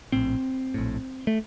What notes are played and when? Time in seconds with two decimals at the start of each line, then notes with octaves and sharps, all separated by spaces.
0.12 A#1 A2 C4
0.74 A#1 A2
1.27 A3